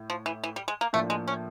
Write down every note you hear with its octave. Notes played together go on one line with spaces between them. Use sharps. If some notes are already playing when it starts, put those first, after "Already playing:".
Already playing: A2
F3
E3
E3
G3
G#3
A#3
A2 F3 A3 A#3 D4
G#3
C#4